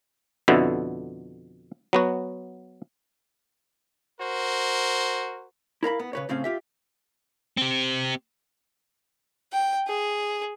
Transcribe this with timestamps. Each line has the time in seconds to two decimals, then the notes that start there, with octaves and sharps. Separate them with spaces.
0.48 F2 B2 D3 E4
1.93 F#3 B3 F#4
4.20 F#4 A#4 C5
5.83 E4 A#4 F5 B5
6.00 B3
6.13 C#3 B4 C#5
6.29 A2 C#3 C4 C#4 F5
6.44 F4 G4 E5
7.57 C4 G4
9.52 G5
9.87 G#4